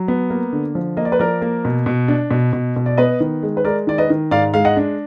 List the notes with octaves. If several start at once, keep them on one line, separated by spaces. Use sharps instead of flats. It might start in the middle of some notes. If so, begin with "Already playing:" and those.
Already playing: F#3
B3
A#3
D3
F3
A#3 D#5
D5
B4
F3 A#4 D5
A#3
B2
B2
D4
B2
B2
B2
D5
B3 B4 D#5
D#3
G#3
B4
G#3 A#4 D5
D#3 D5
B4 D#5
D#3
G#2 D5 F5
G#3 F5
D#5 F#5
D4